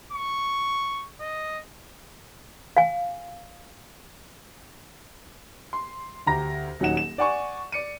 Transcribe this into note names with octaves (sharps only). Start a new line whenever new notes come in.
C#6
D#5
F5 G#5
C6
D2 G4 A#5 A#6
D#1 F#3 D#4 F#5 E7
E7
D5 F#5 G#5 C#6
D5 C#7 D#7